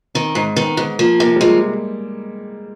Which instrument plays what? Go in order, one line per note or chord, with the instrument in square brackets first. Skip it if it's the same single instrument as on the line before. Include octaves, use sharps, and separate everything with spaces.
[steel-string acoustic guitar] D#3 [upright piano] C4
[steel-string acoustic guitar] G#2
[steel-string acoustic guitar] D#3 [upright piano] B3
[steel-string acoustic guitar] G#2
[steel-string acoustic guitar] F3 [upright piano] A#3
[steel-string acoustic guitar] C3 [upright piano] A#3
[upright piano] G3
[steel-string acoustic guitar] F3 [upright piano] G#3